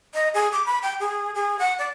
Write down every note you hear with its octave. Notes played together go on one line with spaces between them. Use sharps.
D#5
G#4
D6
B5
G5
G#4
G#4
F#5
D5